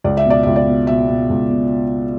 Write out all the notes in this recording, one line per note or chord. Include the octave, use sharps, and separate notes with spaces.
C#2 D5
E5
B2 D5
C#2 E5
D5
B2
B2 E5
B2
C#2
B2